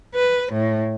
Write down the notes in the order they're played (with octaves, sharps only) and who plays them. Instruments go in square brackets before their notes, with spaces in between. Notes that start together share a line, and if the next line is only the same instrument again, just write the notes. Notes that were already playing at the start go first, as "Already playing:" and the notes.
[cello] B4
A2